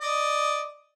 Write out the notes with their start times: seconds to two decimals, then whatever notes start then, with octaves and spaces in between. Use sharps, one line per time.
0.01 D5 D#5